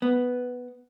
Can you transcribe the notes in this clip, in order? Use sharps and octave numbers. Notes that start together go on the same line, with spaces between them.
B3